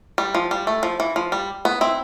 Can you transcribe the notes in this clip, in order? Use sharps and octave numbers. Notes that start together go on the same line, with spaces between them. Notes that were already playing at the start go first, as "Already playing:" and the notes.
G3
F3
G3
A3
F3
E3
F3
G3
B3
C4 E4